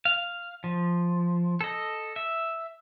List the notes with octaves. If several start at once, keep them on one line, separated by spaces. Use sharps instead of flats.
F5
F3
A4 D#5
E5